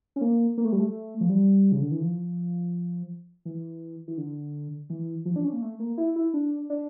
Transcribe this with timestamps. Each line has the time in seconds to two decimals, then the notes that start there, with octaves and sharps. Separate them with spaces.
0.16 C#4
0.21 A#3
0.58 A#3
0.65 A3
0.72 G3
0.80 A3
1.21 F3
1.29 G3
1.72 C#3
1.82 D3
1.92 E3
2.02 F3
3.45 E3
4.08 E3
4.17 D3
4.90 E3
5.25 F3
5.36 D4
5.44 C#4
5.53 A#3
5.62 A3
5.79 A#3
5.98 E4
6.16 E4
6.34 D4
6.70 D4